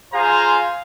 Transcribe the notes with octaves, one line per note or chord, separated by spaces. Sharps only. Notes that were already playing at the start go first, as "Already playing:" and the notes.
F4 G#4 C5 F5 G#5 A#5